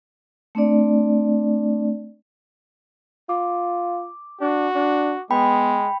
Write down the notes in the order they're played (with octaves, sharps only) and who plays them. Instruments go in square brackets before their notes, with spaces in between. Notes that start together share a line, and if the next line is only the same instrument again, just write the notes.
[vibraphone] A3 C4 D4 D5
[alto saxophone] F4 [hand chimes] D6
[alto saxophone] D4 [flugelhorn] F#4
[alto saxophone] D4
[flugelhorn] G#3 [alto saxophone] B3 [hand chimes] G5 B5